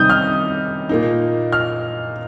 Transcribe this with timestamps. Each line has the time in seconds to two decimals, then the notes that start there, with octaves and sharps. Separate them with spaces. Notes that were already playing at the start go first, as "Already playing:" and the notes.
Already playing: C3 D#3 G3 D#4 D#6 G6
0.10 F6
0.89 A#2 A#3 D#4
1.52 F6